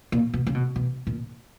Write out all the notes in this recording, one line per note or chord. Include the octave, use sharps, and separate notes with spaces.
A#2
B2
C#3
B2
B2
A#2